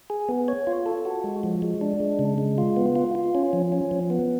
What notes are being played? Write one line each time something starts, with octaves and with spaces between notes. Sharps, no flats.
G#4
B3
C#5
F4
A4
F#4
G#3
F3
G#3
D4
G#3
C#3
G#3
F4
B3
F4
F4
C#4
F3
C#4
F3
B3